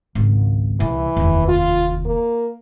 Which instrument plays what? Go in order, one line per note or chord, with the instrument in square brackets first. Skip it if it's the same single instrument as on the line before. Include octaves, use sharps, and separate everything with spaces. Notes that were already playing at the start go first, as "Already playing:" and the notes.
[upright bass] G#1 C#2
[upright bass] C2 [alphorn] E3
[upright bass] F1 D#2
[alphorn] F4
A#3